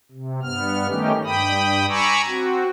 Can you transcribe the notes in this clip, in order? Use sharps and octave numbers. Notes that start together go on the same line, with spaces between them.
C3
G2 B3 F6
D#3 A3 C#4 D#4 G4
G2 G5 B5 D#6
G#5 A#5 B5 C#6 D6 E6
C4 F#4